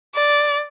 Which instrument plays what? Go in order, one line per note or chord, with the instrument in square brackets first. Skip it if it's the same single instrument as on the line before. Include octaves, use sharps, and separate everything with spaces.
[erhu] D5